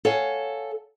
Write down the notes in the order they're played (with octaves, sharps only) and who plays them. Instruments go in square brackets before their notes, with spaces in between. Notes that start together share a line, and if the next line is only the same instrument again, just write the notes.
[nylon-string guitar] A4 C#5 F5 F#5 G#5